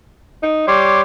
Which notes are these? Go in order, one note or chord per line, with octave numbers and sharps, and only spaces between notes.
D#4
G3 C#5 C6 D6